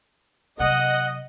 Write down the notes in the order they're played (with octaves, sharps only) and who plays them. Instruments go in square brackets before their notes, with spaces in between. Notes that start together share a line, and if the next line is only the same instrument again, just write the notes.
[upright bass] C3 F#3 [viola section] D#5 [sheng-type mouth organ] F#5